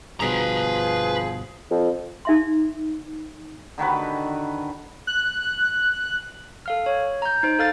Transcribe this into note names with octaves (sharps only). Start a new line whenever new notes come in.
G1 G2 B2 F3 G#4 B4 A#5
F2
D#4 E5 C6
D3 D#3 F#4 B4
F#6
A4 F5 F6
C#5
A#5 G6
D#4 C5
A4 F5 F6 A6